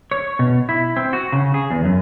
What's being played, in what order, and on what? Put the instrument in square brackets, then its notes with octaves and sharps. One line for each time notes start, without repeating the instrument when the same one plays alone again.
[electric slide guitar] C#5
B2
E4
C4
F#4
C#3
G#4
E2
F#2